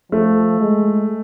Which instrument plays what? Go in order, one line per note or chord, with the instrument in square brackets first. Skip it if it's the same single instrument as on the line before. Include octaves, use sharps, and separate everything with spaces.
[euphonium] F3 [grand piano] A3
[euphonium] G#3